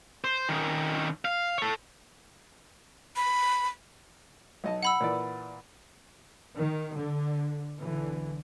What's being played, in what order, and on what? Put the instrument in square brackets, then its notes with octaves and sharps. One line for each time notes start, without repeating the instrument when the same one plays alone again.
[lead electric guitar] C5
D#3 C#4
F5
A4 C#5
[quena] B5
[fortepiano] B1 D#5 A5
[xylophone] F#5 B5 E6
[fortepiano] A#2 E3 D5
[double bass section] D#3
D3
B1 D3 E3